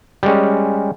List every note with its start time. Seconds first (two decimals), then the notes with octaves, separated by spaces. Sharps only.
0.23 G3 G#3 C#4